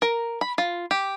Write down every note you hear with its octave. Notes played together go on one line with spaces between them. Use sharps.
A#4
B5
F4
G4